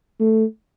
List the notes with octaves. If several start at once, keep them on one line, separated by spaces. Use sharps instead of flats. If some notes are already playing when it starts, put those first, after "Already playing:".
A3